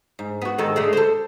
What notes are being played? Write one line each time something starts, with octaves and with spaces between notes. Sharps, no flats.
G#2
B3 F#4
G#2 D#3 A4
D3 G#3 A3
A4 C5